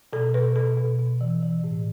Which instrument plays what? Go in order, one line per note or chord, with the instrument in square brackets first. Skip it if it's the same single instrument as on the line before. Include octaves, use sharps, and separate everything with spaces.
[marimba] B2 A4
B2 B4
B2 A4
B2
B2
E3
E3
A2